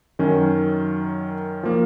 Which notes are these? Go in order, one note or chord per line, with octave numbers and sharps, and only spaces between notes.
F#2 D#3 F#3 C#4
F3 A#3